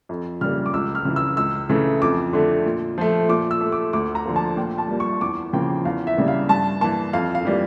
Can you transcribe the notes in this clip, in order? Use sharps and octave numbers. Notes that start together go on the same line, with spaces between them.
F2
C#3 G3 A#3 F6
D6
C#2 E6
F6
C#3 E3
E6
C#2 E6
C#3 E3 A3
F2 D6
D3 A3
A#2
F3 A3
A#2 D6
E6
A3
D6
D2 D6
A#5
D3 F3 A#3
A5
A#2 G5
A5
G3 A#3
C#6
E2 D6
C#3 F3 A#3 G5
E2 F5
E5
C#3 G3 A#3
F5
G2 A5
E3 A#3 A5
F2 F5
F5
E3 G3 A#3